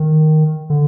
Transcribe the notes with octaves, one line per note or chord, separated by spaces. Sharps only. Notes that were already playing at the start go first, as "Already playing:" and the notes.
Already playing: D#3
D3